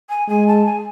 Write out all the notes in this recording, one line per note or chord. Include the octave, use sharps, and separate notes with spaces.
G#5
G#3 G#5
A5
G#5